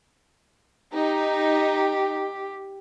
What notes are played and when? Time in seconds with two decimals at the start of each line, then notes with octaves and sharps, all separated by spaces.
0.95 D#4 G4